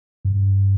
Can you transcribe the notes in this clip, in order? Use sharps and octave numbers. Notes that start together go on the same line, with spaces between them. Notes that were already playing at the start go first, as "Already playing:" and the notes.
G2